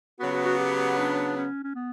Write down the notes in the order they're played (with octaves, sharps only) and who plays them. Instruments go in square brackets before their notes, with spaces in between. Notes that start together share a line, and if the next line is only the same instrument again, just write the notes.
[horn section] C#3 F#3 B3 [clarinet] F#4
[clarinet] F#4
F#4
G4
D4
C#4
C#4
B3